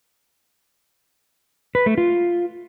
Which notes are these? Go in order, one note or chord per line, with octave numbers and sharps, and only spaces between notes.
B4
A3
F4